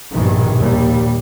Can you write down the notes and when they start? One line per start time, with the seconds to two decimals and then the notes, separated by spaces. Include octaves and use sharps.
0.14 A#1 G2 B2 D#3 E3 G3
0.59 A#1 D#2 A#2 G3 A#3